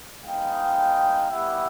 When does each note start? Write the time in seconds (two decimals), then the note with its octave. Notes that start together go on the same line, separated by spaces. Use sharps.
0.24 G#3 B3 D#4 F5 G5
1.31 G3 B3 E4 G4 E5 F#5